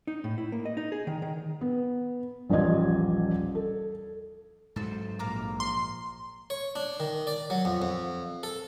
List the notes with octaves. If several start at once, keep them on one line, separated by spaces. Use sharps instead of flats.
D#4
A2
E4
A#3
D#5
D#4
G#4
D#3
D#3
B3
D#1 A1 F3 D5 D#5 G#6
A4
G#2 F#3 A4 C5
A#1 A#3 A#5 D6
C6
C#5
D4
D#3
D5
F#3
F2
F2
A4